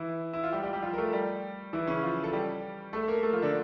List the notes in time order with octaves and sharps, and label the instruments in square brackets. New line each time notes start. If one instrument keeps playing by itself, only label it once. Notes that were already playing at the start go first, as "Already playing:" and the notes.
Already playing: [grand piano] E3 E4
E4
F4
G3 G4
G3 G4
G3 G4
F3 F4
A#4
A3 A4
G3 G4
E3 E4
C#3 C#4
F3 F4
A4
G3 G4
A3 A4
A#3 A#4
A3 A4
F3 F4
D3 D4